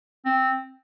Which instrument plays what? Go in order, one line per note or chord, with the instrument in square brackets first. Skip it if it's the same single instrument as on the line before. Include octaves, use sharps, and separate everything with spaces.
[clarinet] C4